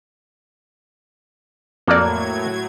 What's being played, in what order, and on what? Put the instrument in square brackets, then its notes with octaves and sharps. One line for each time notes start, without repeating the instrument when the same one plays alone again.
[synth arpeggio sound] F2 D5 [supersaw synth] A2 F#3 G#6 [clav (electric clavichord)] A#3 F#4 A4